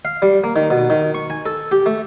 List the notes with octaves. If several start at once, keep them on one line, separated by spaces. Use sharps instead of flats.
F5
G3
A#3
D#3
B2
D#3
C#6
G#5
A4
G4
A3